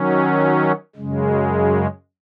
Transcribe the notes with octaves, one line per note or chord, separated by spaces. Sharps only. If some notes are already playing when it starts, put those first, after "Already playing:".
Already playing: D#3 F#3 C#4
F#2 C#3 G#3